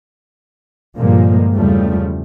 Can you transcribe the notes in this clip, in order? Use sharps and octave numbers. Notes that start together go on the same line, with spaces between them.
G2 A#2 D3 F3 G#3 A#3
E2 C#3 F3 G3 A3